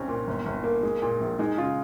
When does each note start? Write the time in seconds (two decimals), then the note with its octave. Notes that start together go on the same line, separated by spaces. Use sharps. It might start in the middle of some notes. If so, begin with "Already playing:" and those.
Already playing: C2 C4 C#4
0.08 A#2
0.27 G1
0.46 G1
0.64 A#3
0.83 G#3
1.02 A#2
1.21 A#1
1.39 G#3 D#4
1.57 C#3 F4